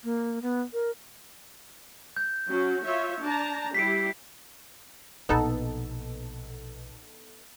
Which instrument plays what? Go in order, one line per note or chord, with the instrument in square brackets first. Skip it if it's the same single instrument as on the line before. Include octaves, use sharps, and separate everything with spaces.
[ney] A#3
B3
A#4
[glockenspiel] G6
[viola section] F#3 C#4 F#4
F4 C#5 E5
D4 A5 A#5
[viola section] G3 E4 G4 [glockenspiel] B6 C7 D7
[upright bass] A#1 B2 [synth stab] B3 D#4 A4